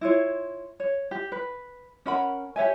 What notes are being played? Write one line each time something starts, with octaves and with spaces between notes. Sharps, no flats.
E4 F4 C#5
C#5
G4
B4
C#4 A#4 F#5 B5
G4 C#5 E5 G#5